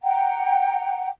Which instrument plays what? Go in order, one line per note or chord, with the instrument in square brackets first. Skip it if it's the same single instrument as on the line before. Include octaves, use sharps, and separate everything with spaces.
[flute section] F#5 G5 A#5